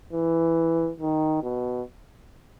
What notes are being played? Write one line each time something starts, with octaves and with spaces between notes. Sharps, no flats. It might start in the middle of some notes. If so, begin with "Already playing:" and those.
E3
D#3
B2